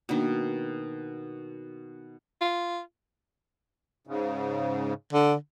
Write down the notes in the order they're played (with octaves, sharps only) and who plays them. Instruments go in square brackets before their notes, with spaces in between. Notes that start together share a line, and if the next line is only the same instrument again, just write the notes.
[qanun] B2 D#3 [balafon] A#3 D4 F#4
[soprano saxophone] F4
[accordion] G#2 C#3
[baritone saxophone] D3